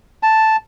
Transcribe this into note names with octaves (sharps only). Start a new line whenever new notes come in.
A5